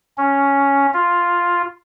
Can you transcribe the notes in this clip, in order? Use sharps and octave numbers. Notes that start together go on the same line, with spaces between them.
C#4
F4